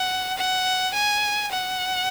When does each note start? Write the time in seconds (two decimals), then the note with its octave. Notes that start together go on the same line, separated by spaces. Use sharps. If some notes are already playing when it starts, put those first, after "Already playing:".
Already playing: F#5
0.37 F#5
0.94 G#5
1.51 F#5